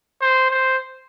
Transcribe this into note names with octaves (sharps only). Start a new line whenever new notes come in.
C5
C5